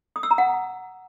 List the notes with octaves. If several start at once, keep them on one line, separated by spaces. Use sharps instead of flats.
D#6
E6
A#5
F#5